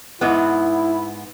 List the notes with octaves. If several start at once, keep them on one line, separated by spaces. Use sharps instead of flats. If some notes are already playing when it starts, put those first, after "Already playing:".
G#2 B3 E4